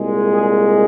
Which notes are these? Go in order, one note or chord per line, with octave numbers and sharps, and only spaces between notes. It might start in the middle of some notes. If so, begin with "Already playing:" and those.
Already playing: C2 A#2 G#3
G#4